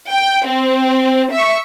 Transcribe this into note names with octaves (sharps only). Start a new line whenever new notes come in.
G5
C4
E5 C#6